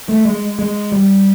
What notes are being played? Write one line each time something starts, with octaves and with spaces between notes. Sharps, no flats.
A3
G#3
G#3
G3